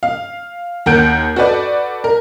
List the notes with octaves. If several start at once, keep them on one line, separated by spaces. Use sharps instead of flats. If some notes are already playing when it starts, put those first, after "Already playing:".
F5
D#2 A#4 F#5 G6 D7
F#4 A4 B4 D5
A#4